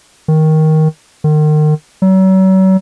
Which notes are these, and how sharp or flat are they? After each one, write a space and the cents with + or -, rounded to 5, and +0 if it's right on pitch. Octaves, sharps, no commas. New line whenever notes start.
D#3 +10
D#3 -35
F#3 +40